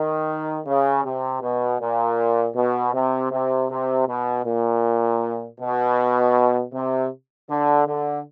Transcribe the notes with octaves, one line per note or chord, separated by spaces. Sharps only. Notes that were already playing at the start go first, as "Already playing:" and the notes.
Already playing: D#3
C#3
C3
B2
A#2
B2
C3
C3
C3
B2
A#2
B2
C3
D3
D3